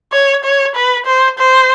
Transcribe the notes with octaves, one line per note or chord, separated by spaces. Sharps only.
C#5
C#5
B4
C5
C5